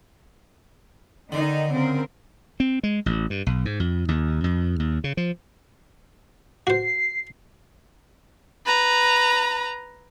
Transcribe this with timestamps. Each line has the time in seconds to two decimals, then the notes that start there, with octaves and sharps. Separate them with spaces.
1.32 D3 D#3 D#4
1.73 C#3 C4 A#4
2.60 C4
2.83 G#3
3.06 A1
3.30 G2
3.46 B1
3.65 G#2
3.80 F2
4.08 D#2
4.44 F2
4.80 D#2
5.04 C#3
5.17 F3
6.67 F#4 C5 C7
8.66 B4 A#5